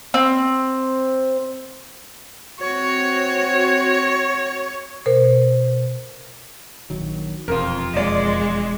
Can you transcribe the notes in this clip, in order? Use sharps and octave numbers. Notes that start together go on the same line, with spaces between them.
C4
C4 F#4 C#5
B2 A#4 C5
A#1 D#3 F#3
E1 F2 C3 F4 A#4
E1 G#3 D5 D#5